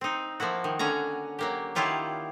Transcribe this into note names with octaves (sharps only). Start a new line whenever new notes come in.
C4 D#4
F3 A#3 E4 F#4
D#3
D3 C#4 C#5 A#5
F#3 A#3 G4
D#3 F#3 E4 F4 G4 C#5